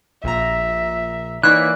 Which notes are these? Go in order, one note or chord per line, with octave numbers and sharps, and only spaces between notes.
A#1 A#2 E5 A#5
E3 A#3 D#4 C#5 D5 F#6 B6